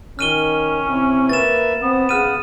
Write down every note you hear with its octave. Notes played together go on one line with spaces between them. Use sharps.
D#3 C#4 F6 D#7 G7
C3 E4
A#3 B4 E5 A6 E7
B3 C4
C#3 F#5 F6 D#7